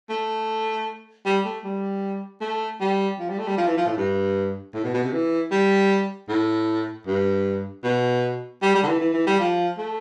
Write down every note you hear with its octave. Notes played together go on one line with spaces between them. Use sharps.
A3
G3
A3
G3
A3
G3
F3
G3
A3
G3
F3
E3
F3
A2
G2
A2
B2
B2
C3
E3
G3
A2
G2
B2
G3
G3
D3
E3
E3
E3
G3
F3
A3